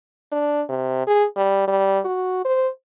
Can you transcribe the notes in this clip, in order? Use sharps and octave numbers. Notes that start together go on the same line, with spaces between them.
D4
C3
G#4
G3
G3
F#4
C5